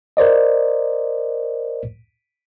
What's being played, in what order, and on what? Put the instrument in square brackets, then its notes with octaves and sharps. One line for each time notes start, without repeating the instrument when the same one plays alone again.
[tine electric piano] A#4 C5 D5 D#5